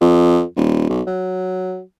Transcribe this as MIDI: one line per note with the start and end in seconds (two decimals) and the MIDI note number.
0.01 0.43 41
0.56 0.86 27
0.89 1.01 35
1.07 1.81 54